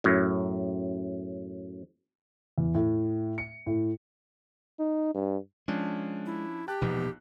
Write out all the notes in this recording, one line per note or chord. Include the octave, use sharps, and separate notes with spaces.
F#2 A2
E2
A2
C#7
A2
D#4
G2
F3 G#3 C#4 D4
E4
G4 G5 A5 F#6
E1 A#1 B2 F3 B3 D#4